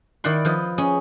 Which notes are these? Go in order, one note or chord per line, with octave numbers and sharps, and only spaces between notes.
D#3 E4 D5 F#5 C6
F3 B4 D#5
C#4 G#4 D#5